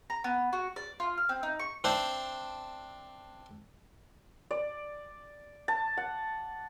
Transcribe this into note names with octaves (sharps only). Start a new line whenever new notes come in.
A#5
B3
F#4
D5
F4
F6
C4
D#4
C#6
C4 D4 C5 E5
D5
A5
F#5